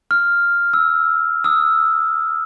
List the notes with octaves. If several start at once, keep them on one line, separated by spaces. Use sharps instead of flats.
F6
E6
D#6 E6